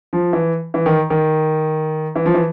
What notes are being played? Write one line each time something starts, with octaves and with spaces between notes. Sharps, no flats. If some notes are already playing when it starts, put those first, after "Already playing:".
F3
E3
E3
D#3
D#3
E3
F3
E3